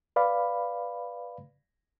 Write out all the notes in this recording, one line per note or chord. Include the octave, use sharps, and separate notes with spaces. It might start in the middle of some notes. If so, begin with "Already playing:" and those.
B4 D5 F5 B5